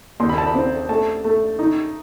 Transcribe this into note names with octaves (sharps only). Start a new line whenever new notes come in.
D#2 C6
B5
A5
B5
C4
A3 A5
A3
D#4